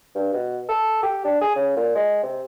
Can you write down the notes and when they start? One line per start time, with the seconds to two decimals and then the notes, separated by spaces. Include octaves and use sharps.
0.15 G2
0.33 B2
0.69 A4
1.03 G4
1.25 D4
1.41 G#4
1.56 C#3
1.77 A#2
1.95 G#3
2.23 C3